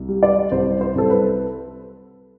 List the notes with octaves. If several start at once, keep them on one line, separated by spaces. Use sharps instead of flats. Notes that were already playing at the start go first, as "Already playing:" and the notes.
Already playing: C2
G3
D5
C2 C5
C5
C2 A4
B4